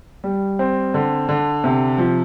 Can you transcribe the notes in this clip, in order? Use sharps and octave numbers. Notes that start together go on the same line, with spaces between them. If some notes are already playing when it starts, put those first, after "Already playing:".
G3
C4
D3
D3
C3
F3